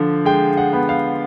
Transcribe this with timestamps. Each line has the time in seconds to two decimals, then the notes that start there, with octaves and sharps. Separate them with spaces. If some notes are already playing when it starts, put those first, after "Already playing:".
Already playing: D3 F3
0.25 G#3 G5
0.57 F#5
0.73 B3
0.89 F5